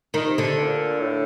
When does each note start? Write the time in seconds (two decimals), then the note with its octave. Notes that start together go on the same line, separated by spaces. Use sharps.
0.14 A#2 D#3 D#4
0.26 C3
0.38 D3 D4
0.58 C3
0.63 A#2
1.00 A2